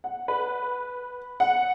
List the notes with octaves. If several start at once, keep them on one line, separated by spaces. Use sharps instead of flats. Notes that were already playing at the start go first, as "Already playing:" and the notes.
F#5
B4
F#5